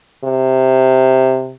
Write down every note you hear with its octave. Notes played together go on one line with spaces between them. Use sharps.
C3